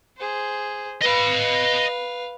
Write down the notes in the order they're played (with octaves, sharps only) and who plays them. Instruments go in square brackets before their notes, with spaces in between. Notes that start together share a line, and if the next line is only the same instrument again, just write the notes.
[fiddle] G#4 C5
[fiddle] B4 F5 [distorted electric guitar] D#5 B5